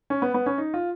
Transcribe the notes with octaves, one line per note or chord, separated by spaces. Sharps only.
C#4
B3
B3
C#4
D#4
F4